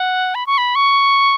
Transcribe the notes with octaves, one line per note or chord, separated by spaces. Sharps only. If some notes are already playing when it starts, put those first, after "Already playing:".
Already playing: F#5
B5
C#6
B5
C#6